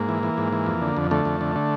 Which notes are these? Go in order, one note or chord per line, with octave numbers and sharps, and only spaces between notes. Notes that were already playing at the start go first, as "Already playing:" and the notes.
Already playing: G#2 A#3
E3
E3
G#2
E3
F2
D3
F2
D3 A3
F2
D3
D3